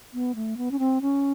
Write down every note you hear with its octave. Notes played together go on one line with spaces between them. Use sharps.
B3
A3
B3
C#4
C4
C#4